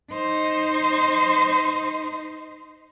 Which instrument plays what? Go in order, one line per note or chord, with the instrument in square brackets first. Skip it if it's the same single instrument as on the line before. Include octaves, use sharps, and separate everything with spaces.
[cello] D#4 C5